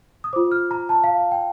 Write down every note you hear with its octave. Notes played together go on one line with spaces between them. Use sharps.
D#6
F4 C5 D6
F6
A#5
A5
F5
F5
G5